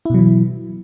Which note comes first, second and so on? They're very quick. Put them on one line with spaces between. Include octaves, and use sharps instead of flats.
E4 B2 F#3 E3